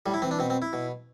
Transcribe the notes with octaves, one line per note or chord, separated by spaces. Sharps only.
A2 G3
E4
E3 C4
D4
B2 C4
C4
E4
B2